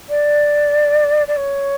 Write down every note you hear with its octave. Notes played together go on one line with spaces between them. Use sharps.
D5
D5
C#5